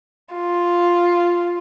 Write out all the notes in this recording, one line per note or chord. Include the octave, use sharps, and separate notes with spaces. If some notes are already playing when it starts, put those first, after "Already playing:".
F4